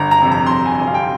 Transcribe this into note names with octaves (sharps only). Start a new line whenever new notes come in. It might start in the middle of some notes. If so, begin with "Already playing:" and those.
Already playing: G1 A#5
A#5
F2 C3
A#5
C6
G1 A#5
G#5
F2 C3 G#5
F5
G5